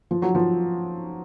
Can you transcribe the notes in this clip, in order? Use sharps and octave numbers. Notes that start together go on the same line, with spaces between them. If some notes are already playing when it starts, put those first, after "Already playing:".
F3
F#3
F3